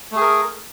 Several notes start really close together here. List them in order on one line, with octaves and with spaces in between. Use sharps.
A3 G#4 A#4